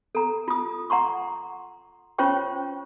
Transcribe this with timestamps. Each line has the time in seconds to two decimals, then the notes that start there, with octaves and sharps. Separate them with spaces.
0.15 A4 A#5
0.48 F4 D#6
0.90 F#5 A#5 C6 C#6
2.18 C#4 F4 C5 C#5 G5 C#6